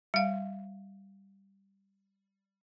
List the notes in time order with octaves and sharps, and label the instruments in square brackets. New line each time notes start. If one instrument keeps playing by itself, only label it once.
[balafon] G3 F5